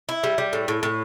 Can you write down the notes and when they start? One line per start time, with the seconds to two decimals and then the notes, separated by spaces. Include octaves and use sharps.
0.09 E4
0.23 G3
0.38 G3
0.53 A2
0.68 A2
0.83 A2